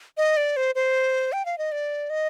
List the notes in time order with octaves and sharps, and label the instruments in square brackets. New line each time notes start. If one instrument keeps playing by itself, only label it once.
[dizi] D#5
D5
C5
C5
G5
F5
D#5
D5
D#5